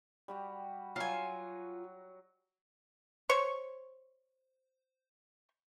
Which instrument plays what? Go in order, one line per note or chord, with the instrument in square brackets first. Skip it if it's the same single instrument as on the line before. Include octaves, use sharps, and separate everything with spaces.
[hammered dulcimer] G3 F#4 G4
[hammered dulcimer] F#3 F#5 A#5 [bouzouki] F4 G#5
[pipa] C5 C#5 C#6